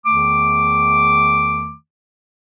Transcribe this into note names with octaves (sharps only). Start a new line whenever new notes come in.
E2 D#3 A3 D6